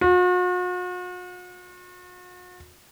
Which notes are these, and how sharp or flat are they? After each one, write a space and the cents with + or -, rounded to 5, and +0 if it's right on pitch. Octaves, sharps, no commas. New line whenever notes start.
F#4 -45